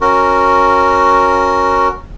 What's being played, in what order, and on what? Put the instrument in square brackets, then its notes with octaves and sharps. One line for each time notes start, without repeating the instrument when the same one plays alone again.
[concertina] C#4 F#4 A#4